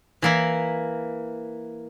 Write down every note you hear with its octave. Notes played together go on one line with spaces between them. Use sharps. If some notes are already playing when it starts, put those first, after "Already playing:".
E3 A#3 E4